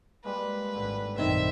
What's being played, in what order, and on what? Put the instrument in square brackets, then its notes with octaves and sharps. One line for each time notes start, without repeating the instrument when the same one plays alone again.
[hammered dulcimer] G3 G#3 A#3 [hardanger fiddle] B4
[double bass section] G#1 [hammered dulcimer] D3
[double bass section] A#1 F#2 [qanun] D#3 C4 [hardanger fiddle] E5